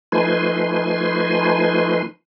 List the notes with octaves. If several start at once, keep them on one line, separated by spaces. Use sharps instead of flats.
F3 A3 D#4 B4 G#5 C6